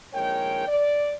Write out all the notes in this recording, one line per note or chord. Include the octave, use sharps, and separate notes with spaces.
A#1 D#3 G#3 A#4 C#5 G5
D5